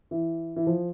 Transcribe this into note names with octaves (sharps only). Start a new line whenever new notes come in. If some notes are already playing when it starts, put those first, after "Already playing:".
E3
E3
F3